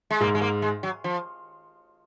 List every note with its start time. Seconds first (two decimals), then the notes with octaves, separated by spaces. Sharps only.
0.11 G#3
0.21 G#2 A#3
0.35 G#3
0.41 A#3
0.62 G#3
0.83 F#3
1.04 F3